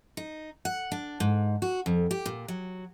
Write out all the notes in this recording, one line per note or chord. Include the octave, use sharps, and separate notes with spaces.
D#4
F#5
D4
G#2
F#4
F2
G4
A#2
F#3